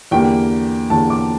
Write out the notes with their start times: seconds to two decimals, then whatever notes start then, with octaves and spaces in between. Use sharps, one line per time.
0.11 E2 D3 G3 A#3 G5
0.90 E2 D3 G3 A#3 A5
1.10 D6